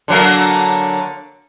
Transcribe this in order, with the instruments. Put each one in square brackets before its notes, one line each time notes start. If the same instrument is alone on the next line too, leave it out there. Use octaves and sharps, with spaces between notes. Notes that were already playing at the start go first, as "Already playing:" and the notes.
[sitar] D3 F#3 A#3